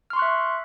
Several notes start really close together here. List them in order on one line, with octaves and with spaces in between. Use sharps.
F6 C6 C#6 F#6 E5